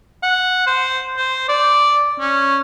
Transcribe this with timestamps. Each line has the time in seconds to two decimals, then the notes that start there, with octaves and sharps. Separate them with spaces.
0.23 F#5
0.67 C5
1.17 C5
1.49 D5
2.19 C#4